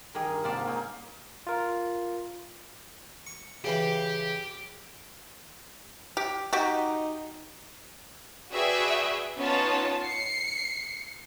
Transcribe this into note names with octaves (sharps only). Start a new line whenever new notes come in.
D#3 G3 G#4 A#4
G2
G#2 C3 A#3 D5 F5 A5
C#4 D#4
F4 A#4
C#6
C#3 E3 G4 F5
G4
D#4 F#4 G4
F#4 G#4 B4 D5 E5 G5
B3 C#4 D#4 F4 C#5 A5
C7 C#7